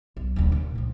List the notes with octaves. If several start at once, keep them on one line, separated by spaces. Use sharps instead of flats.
B1
D1 D3
A#2
C#2 F3